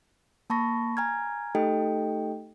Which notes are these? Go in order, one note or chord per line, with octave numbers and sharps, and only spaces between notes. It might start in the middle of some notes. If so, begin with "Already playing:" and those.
A#3 A5 B5 C#6 A#6
G#5 A#5 F6 G#6
A3 D#4 G4 A4 D#5 G5